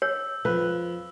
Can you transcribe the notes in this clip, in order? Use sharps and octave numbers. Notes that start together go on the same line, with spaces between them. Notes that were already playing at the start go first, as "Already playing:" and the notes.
C#5 E6
F2 B4